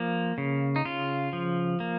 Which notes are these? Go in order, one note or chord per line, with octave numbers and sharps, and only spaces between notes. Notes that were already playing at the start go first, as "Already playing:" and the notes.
Already playing: F3 A#3
C#3
D#4
C#3 F4
F3
A#3